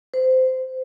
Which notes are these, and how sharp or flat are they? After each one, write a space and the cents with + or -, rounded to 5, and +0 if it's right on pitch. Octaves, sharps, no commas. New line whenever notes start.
C5 -20